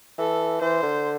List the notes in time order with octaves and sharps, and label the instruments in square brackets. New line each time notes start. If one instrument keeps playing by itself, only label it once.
[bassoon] E3 [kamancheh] A4
[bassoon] E3 [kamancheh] C5
[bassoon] D3